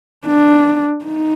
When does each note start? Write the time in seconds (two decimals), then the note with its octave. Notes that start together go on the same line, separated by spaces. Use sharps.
0.26 D4
1.05 D#4